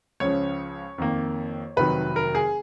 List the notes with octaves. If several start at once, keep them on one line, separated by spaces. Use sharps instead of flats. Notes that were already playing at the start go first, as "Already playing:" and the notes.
C#2 C#3 F3 C#5
F2 D#3 A#3
F1 F2 D#3 F#3 B4
A#4
G#4